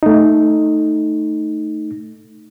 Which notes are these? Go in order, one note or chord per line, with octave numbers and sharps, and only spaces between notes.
A3 D#4